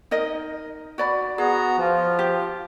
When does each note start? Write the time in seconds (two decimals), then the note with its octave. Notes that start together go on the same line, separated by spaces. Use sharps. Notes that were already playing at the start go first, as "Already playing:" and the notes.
0.11 D#4 A#4 D#5
0.98 F#4 D5 B5
1.38 B3 F#4 G#4 A#5
1.78 F3 F4
2.19 G4